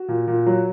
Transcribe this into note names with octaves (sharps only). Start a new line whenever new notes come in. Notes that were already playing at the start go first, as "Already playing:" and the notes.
Already playing: F#4
A#2
A#2
F#3